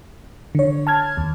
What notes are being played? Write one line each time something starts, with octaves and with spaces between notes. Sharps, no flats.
D3 C#5
A5 F6 G#6
D#2